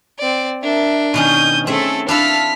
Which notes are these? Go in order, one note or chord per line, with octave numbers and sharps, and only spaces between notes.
C4 D5
D4 A#4 E5
B2 D#3 C#4 D#6 G6
A3 C4 C#4 G#4 A4 E5
D4 E4 A4 F5 A5 F6 B6